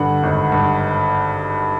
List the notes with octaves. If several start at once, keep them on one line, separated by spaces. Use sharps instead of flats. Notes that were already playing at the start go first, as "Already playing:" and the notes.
Already playing: G2 D3 F#5
G#1
G2